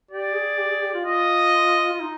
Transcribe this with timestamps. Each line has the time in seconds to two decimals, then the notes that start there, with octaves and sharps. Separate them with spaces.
0.11 G4 D5
0.35 G#4
0.58 G4
0.70 G#4
0.82 G4
0.94 F4
1.05 F4 D#5
1.93 F4
2.00 D#4